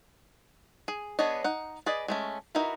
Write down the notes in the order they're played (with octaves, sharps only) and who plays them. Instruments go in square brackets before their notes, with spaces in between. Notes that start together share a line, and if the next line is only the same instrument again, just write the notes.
[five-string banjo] G#4
B3 D4 G#4 C#5 D#5
D#4 F#5
G#4 B4 D5 D#5
G#3 A3 C#4
D#4 E4 F#4 A#4 B4